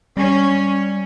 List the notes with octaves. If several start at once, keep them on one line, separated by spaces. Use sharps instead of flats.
G3 C#4